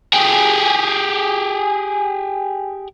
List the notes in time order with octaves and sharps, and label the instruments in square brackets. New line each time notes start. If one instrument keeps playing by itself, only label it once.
[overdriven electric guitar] G4 G#4